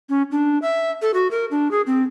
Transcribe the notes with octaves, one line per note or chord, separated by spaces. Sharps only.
C#4
D4
E5
A4
F#4
A#4
D4
G#4
C4